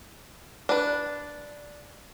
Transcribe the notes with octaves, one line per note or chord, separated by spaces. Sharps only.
D4 B4